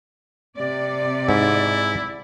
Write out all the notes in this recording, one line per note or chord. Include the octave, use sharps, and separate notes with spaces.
C3 D5
G#2 E4